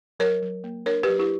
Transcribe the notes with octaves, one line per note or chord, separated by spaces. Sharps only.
F#3 A#4 C#5
F#3
A#3
D4 A#4 C#5
F#3 G4 B4
E4 G4